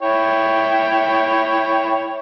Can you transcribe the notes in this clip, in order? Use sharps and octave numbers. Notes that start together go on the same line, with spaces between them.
E4 C#5 G5